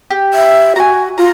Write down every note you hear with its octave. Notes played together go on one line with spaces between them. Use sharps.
G4
E5
F#4 G#5 A#5
F4 A#5